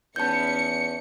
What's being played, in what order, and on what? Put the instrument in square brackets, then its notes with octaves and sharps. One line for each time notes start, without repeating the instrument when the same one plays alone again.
[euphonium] E2 [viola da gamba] B3 C#4 D#4 [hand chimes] A5 G6 [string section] C#7